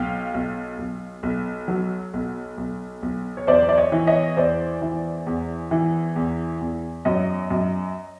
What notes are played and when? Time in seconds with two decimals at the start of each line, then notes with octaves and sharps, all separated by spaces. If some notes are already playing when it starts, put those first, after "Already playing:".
Already playing: B1 F5 G5
0.34 B1
0.79 B1
1.23 B1
1.68 F#3
2.14 B1
2.58 B1
3.03 B1
3.37 C#5
3.47 E2 C5 D5
3.69 D5
3.77 C#5 D#5
3.92 E3
4.07 C#5 D#5
4.37 E2 C5 D5
4.82 E3
5.27 E2
5.71 E3
6.16 E2
6.61 E2
7.05 F#2 C#5 D#5
7.50 F#2